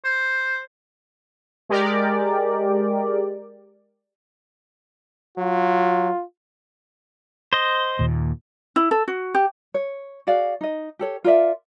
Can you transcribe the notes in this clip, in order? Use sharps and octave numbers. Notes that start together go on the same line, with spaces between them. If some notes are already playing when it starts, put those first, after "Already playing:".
C5
G#3 G4 A#4 D5
F#3 F4
C5 D#5
D#2 A#2
E4
A4
F#4
G4
C#5
F#4 G#4 D5 F5
D#4 D#5
G4 A4 C#5
F4 A#4 D5 E5